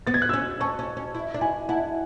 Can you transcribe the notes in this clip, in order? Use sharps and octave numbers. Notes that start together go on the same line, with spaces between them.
B3 A6
G#6
F#6
C#4 E6 G#6
C#4 A5 C#6
C#4
C#4
E4
D4
E4 G#5
E4 F#5 A5